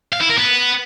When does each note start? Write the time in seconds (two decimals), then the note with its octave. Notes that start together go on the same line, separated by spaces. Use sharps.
0.12 F5
0.21 E4
0.29 A#4
0.38 B3